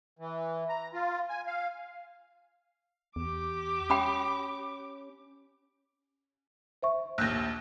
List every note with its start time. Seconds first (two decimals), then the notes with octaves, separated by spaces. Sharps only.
0.19 E3
0.69 A#5
0.94 F4
1.29 G#5
1.47 F5
3.16 E2 G4 D6
3.90 C#4 G5 B5 D#6
6.83 C5 E5 C#6
7.18 A#1 D#2 F#6 G6 A#6